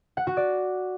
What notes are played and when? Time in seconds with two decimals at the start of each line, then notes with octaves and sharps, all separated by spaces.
0.17 F#5
0.27 F#4
0.37 D5